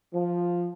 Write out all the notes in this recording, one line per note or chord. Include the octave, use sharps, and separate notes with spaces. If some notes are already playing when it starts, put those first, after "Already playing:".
F3